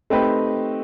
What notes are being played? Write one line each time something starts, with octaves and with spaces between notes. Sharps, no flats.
A3 C4 D#4 G4 B4